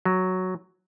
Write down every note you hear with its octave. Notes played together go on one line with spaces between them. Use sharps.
F#3